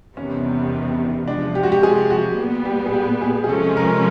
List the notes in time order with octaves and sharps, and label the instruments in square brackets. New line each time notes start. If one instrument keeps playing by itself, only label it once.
[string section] E2 C3 D#3 G3 B3 [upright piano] C#4
[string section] C3 F3 G#3 [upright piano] D4
[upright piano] G4
F#4
G4
G#4
F#4
[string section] A#2 G3 B3
[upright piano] G4
G#4
G4
G#4
G#4
[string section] C3 F3 G#3 C#4 [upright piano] A4
[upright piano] A#4